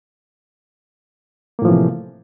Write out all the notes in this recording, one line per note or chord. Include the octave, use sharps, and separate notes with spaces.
A2 C3 E3 F3 A#3